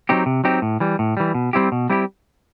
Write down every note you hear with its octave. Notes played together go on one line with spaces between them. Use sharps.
F#3 C4 D#4 G4
C3
F#3 C4 D#4 G4
A2
E3 G3
A2
E3 G3
B2
G3 C4 E4 G4
B2
G3 C4 E4 G4